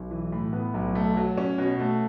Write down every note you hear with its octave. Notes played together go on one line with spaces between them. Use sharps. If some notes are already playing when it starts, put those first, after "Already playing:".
Already playing: B1
E3
A2
B3
B1
A3
F#3
C#4
B2
A3